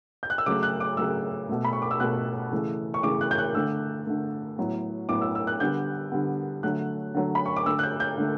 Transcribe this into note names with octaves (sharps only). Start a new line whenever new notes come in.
G6
F#6
E6
C#3 F#3 A3 D6
F#6
D6
C#3 F#3 A3 E6
B2 A3
B5
C#6
D6
E6
B2 A3 F#6
C#3 E3 A3
C#6
C#3 E3 A3 D6
F#6
G6
F#6
D3 A3 E6
D3 A3
A2 F#3 B3
A2 F#3 B3 D6
E6
E6
F#6
D3 G3 B3 G6
D3 G3 B3
D3 F#3 A3 F#6
D3 F#3 A3
B5
C#6
D6
D3 A3 E6
F#6
G6
G6
D3 A3